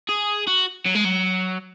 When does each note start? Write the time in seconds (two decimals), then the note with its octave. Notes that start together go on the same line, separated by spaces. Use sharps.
0.09 G#4
0.48 F#4
0.86 F#3
0.95 G#3
1.05 F#3